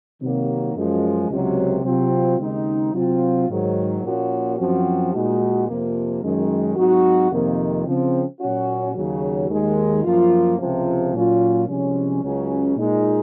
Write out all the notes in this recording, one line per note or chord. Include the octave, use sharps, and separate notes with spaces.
C3 D#3 F#3 A#3
F#2 F3 G#3
C#2 C3 F#3
C3 F#3 C4 F4
D#2 C#3 G#3 C4 D#4
C3 F#3 C4 F4
G#2 D#3 F#3
A#2 F3 A#3 C#4 F#4
F#2 F3 C4 F#4
A#2 G#3 D#4 F#4
F2 C3 F3 A#3
F#2 D#3 G#3
G#2 F#3 C4 D#4 F#4
F2 C3 D#3 A#3
C#3 F3 C4
A#2 F#3 C#4 F#4
D#2 C#3 F#3
D#2 D#3 G#3
F#2 F3 A#3 F4
C#2 C3 F3
A#2 F#3 C#4 F4
C2 C3 F3 G#3 C#4
C#2 C#3 F#3 C#4
A#2 G#3 D#4